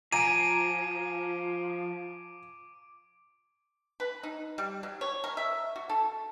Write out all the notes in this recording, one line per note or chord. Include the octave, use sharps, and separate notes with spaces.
F3 G#5 A#5 D6 D7 D#7
B4
D#4
G3
F#3
C#5
A#4
E5
F#4
A4